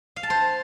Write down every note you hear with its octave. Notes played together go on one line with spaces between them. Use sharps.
F5
A5
C5